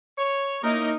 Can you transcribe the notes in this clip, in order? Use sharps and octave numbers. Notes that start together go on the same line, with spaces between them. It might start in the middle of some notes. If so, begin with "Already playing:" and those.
C#5
A#3 C#4 D#4 E4 A#4 D#5